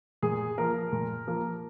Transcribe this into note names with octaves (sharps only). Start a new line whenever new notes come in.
A#2 G#4
F3 A#3 A#4
A#2
F3 A#3